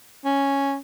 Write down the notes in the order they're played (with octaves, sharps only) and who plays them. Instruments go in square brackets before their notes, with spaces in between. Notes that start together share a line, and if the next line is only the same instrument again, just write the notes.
[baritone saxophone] C#4